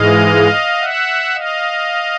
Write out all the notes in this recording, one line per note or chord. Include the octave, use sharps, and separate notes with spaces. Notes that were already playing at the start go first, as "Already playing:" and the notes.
Already playing: G#2 E3 G#3 D#5 F5
E5 F#5
D#5 F5